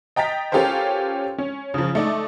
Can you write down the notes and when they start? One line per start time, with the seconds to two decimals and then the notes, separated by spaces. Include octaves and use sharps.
0.16 D#5 G5 A#5 A6 B6
0.52 C#4 F4 G4 A4 A#4 C5
1.38 C#4
1.74 C#3 F3
1.95 A3 D#4 D5